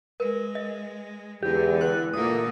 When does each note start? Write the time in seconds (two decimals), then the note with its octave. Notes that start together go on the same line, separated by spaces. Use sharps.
0.20 G#3 A#4 B4
0.55 D#5
1.43 E2 D3 G#3 G4
1.81 B4 F#6
2.14 A#2 D3 A3 A#3 D#6